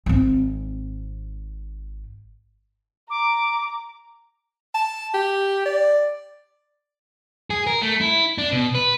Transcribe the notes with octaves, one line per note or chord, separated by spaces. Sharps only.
G#1 C4
A#5 D6
A5
G4
D5
G#4
A#4
A3
E4
D4
B2
B4